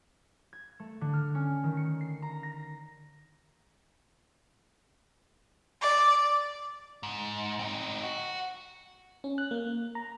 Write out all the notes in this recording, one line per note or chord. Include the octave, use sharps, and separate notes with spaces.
G#6
A3
D3
F6
C#4
D#3
C#7
C7
A#5
A#6
D5
G#2
C4 D#4
F#4
C#4
F#6
A#3
A#5